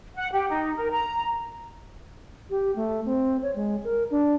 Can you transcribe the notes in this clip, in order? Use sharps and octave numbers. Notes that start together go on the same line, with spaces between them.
F#5
G4
D#4
A#4
A#5
G4
A3
C4
C#5
G#3
A#4
D4